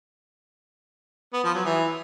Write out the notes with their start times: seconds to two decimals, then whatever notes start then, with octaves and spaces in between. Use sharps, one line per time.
1.33 B3
1.44 F3
1.54 F#3
1.65 E3